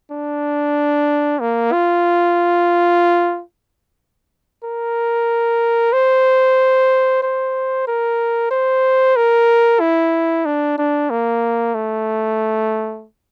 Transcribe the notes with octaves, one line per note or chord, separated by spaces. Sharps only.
D4
A#3
F4
A#4
C5
C5
A#4
C5
A#4
E4
D4
D4
A#3
A3